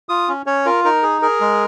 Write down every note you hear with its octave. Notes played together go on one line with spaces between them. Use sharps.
F4 D#6
C#4
C#4 C#5
F4 A#4
D#4 A#4
G#4
G#4 A#4
G#3